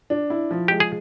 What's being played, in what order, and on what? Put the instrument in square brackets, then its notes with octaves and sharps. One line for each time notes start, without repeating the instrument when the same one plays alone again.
[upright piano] D4
E4
F3
[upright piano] G#3 [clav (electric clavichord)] G4
[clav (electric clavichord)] G#4